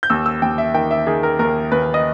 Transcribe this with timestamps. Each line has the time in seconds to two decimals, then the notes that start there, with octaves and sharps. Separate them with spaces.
0.03 G6
0.10 D#2 E6
0.26 E6
0.42 D#2 G5
0.58 E5
0.74 D#3 G5
0.91 E5
1.07 D#3 G#4
1.23 A#4
1.39 D#2 A#4
1.72 D#2 B4
1.94 D#5